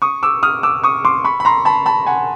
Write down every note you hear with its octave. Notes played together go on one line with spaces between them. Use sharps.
C#6 D#6
D6 E6
D#6 F6
D6 E6
C#6 D#6
C6 D6
B5 C#6
B5
A#5 C6
A5 B5
A5 B5
F#5 G#5